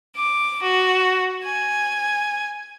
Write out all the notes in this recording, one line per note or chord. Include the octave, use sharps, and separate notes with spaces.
D6
F#4
G#5